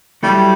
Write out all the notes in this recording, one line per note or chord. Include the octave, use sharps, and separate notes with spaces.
F#3 G3 A3 E4 A4